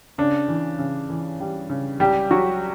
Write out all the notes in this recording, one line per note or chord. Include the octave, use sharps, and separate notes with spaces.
C#3 D4
E3
C#3
E3
G3
C#3
C2 G3 G4
C2 F#3 F#4